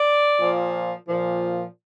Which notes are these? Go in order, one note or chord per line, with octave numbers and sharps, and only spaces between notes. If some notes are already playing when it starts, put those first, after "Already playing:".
Already playing: D5
A#2 F3
A#2 F3